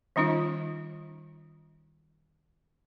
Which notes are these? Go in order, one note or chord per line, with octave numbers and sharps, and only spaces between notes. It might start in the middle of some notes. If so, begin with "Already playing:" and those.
D#3 G3 C#4 D#4 F4